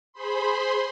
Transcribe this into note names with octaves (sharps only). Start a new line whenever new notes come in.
G#4 C5 B5 C6